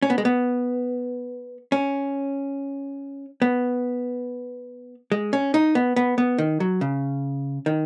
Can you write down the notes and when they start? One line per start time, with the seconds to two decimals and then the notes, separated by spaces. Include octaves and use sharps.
0.02 C#4
0.10 B3
0.18 G#3
0.25 B3
1.72 C#4
3.42 B3
5.12 G#3
5.33 C#4
5.54 D#4
5.75 B3
5.96 B3
6.18 B3
6.38 D#3
6.60 F#3
6.81 C#3
7.66 D#3